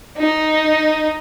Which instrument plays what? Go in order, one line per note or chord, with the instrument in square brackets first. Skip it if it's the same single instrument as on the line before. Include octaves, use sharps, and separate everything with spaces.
[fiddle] D#4